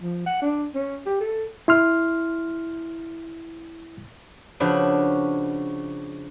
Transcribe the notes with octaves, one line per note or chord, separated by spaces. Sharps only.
F3
F#5
D4
C#4
G4
A4
E4 C6 F6
C#3 F3 D4 F#4 B4